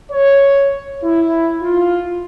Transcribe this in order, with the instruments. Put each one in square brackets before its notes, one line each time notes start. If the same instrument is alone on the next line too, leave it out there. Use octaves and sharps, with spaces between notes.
[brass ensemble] C#5
E4
F4